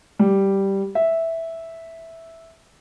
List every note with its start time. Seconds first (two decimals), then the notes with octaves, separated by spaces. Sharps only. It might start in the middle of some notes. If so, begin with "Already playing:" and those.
0.19 G3
0.95 E5